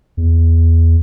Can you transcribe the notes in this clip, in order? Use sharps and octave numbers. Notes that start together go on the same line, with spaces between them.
E2